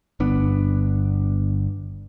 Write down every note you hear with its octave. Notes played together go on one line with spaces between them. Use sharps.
G1 B3 D4